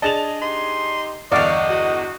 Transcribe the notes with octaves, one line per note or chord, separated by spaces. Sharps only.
D4 G#4 D#5 A5 F7
D#4 G4 D#5 C6
G1 E2 D5 D#5 F5 C#6
F#4